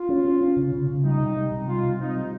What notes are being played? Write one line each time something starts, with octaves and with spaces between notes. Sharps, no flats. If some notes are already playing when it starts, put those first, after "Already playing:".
Already playing: F4
C#4
C#4
C#4
C#3
C#3
C#3
G3 D#4
C3
G3
C3
G3 F4
C3
C4 D#4
G3